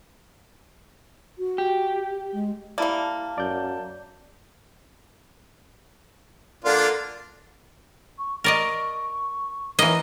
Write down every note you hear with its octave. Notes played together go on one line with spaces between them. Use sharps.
F#4
G4
G#3
G3 A#3 E4 D5 A5
F#2 D5 G6
D3 A#3 D4 F4
C#6
A#4 D5 D#5 C#6
E3 A#3 C#5 D#5